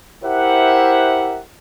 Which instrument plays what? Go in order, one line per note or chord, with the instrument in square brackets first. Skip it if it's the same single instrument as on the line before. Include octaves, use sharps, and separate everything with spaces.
[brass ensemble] E4 G4 A#4 C5 E5 F#5